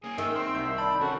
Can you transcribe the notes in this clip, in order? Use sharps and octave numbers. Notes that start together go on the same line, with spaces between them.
A#3 C#4 G#4
D#3 E5
C4 C6
C2 G6
D5 A5 B5
D#3 C#4 D4 F#4 A4